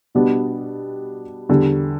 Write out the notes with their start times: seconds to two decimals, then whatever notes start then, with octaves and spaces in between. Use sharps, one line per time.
0.15 B2 G3 B3 D4
1.49 E2 D3 G3